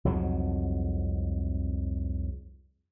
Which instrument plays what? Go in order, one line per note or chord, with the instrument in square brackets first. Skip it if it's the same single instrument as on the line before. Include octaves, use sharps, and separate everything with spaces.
[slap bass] C2 F2 G#2 F#3